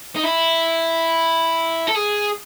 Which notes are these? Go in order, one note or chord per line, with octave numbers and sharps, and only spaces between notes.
D#4
E4
A4
G#4